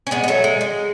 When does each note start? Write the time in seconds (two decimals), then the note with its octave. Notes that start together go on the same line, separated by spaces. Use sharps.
0.07 C#4
0.11 G#3 B3
0.24 G#3
0.28 F#3 A3
0.44 G#3
0.61 G#3